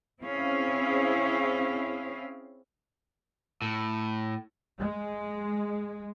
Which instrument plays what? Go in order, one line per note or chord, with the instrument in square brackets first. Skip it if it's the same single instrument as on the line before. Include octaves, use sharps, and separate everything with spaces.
[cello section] C4 C#4 E4 G#4 F5
[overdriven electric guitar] A2
[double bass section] G#3